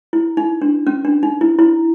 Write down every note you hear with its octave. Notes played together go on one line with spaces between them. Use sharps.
E4
D#4
D4
C#4
D4
D#4
E4
E4